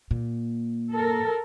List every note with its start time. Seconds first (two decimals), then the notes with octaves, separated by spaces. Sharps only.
0.11 A#2
0.93 A4 A#4